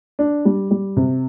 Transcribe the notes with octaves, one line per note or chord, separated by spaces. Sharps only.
D4
G3
G3
C3